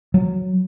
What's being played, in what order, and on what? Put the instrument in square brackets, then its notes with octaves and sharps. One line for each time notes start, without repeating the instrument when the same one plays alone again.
[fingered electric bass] F#3